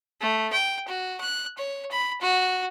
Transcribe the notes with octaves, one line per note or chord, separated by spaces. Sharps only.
A3
G5
F#4
F#6
C#5
B5
F#4